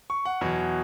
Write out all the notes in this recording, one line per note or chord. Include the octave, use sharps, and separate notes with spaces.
C#6
F#5
E2 B2 F#3